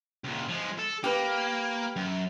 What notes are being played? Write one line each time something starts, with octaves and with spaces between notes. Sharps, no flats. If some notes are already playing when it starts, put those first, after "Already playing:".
C#2 A#2
F3 G#3
A4
A#3 G4 B4
F#2